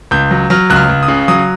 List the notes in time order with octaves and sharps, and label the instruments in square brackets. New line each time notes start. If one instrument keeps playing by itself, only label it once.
[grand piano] C#2 G6
F#3
F#3 F6
C#2 F#6
F6
C#2
D#6
C#3
F#3 D#6